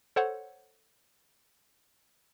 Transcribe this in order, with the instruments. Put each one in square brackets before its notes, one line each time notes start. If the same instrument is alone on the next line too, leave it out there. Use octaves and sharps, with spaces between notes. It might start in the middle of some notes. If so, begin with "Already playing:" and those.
[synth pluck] A4 C5 C#5 F#5